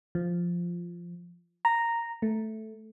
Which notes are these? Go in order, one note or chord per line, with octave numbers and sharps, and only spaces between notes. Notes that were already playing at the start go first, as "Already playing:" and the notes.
F3
A#5
A3